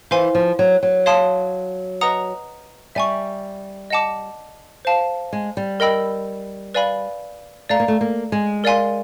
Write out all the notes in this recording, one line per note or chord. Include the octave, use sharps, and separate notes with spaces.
E3 C5 F5 G#5 C6
F3
F#3
F#3
C#5 F5 A5 C6 D#6
B4 D#5 F#5 A#5 D#6
G3 E5 G#5 C#6
D#5 F#5 A5 D6
C5 F5 A5
G#3
G3
A#4 D#5 G5 B5 E6
B4 D5 F5 G#5 B5
A3 D5 F5 A#5
A#3
A3
A#3
G#3
A#4 D5 F5 G#5 C6